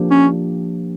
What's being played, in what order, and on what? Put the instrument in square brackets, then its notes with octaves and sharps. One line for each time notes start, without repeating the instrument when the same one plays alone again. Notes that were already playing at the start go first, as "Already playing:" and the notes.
Already playing: [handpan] F3 A#3 D4 G4
[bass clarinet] C#4